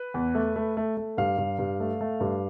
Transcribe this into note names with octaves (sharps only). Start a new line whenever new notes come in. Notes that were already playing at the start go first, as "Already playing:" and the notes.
Already playing: B4
E2
A3
A3
A3
A3
G2 F5
G2
G2
A3
A3
G2